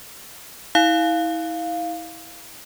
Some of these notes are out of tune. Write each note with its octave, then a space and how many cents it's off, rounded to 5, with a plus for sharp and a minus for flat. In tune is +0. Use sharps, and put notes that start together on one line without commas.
E4 -35 F5 +0